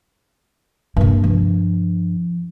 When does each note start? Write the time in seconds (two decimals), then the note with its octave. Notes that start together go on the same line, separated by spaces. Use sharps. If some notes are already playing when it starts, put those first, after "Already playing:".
0.97 G2 C3 A#3
1.24 F3